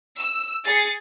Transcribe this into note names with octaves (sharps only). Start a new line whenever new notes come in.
E6
G#4 A6 C7 C#7